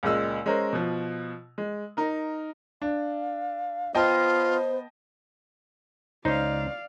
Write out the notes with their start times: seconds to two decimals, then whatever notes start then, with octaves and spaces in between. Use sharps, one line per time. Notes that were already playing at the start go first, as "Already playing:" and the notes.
0.03 C#2 A#2 G#3 E6
0.46 G#3 C#4 A#4 C5
0.73 B2 F3
1.58 G#3
1.97 D#4 A#4
2.82 D4 F5
3.95 B3 F4 C5 D#5 G5 A5
6.25 C#2 C#4 D#4 C5 D5 F5